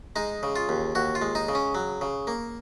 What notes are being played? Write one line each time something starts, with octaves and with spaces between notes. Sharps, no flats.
G#3 D#4
C#3
F4
D#2
D#2 F#4
F4
G#3
D#4
C#3
C#4
F#3
C#3
A#3